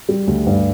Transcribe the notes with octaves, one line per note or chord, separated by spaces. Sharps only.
G3
D2
G2